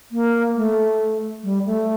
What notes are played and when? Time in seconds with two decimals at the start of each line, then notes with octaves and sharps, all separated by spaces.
0.12 A#3
0.56 A3
1.43 G3
1.66 A3